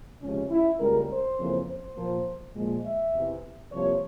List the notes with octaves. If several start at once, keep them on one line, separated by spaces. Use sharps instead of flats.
C#2 C3 F3 G#3 C#4
E4
C#2 C#3 G3 A#3 A#4
C5
F2 C#3 E3 A#3
C5
A#2 F3 A#3
A#2 F3 G#3
E5
E2 C3 E3
C2 C3 F3 A#3 C#5